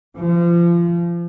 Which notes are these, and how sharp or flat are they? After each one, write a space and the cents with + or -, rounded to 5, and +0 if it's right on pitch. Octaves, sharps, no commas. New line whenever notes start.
F3 -30